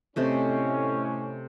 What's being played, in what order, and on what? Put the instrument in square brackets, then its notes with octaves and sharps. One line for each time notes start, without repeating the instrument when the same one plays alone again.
[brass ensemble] A2 C#4 [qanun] C3 A3 D#5